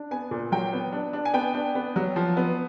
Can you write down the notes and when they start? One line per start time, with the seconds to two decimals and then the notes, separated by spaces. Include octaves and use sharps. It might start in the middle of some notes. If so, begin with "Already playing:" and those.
Already playing: D4
0.11 B3 G#5
0.31 A#2
0.52 F#3 G5
0.73 B3
0.93 D4
1.13 D4
1.25 G#5
1.34 B3 G5
1.54 D4
1.75 B3
1.96 F#3
2.16 F3
2.37 B3